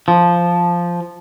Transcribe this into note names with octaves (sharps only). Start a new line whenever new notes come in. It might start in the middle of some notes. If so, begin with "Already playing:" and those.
F3